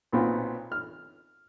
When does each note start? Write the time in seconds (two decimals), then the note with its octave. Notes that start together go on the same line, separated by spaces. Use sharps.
0.13 B1 A#2 B3 C4 F4
0.72 F6